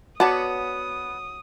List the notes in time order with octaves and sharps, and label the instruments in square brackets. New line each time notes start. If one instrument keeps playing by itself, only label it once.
[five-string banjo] B3 [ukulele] F#4 C#5 F#5 [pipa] B4 D5 A5 [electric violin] D#6